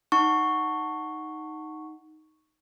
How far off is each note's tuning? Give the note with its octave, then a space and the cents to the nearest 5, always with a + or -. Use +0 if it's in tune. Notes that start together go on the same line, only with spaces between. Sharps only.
D#4 +0 F#5 +0 C#6 +0